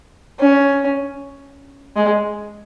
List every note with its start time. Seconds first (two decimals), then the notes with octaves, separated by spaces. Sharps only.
0.39 C#4
1.96 G#3